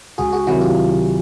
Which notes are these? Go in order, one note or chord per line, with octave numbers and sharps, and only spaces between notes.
C#2 F#4 G#4
F#4 G#4
C3 D#3 F#3 E4 F#4
F4 G4